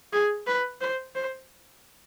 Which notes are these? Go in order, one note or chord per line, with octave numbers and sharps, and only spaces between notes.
G#4
B4
C5
C5